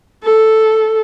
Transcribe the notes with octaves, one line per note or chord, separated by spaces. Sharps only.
A4